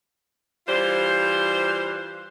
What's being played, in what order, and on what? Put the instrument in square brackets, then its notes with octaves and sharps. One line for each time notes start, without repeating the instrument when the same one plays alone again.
[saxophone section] E3 G3 F4 C5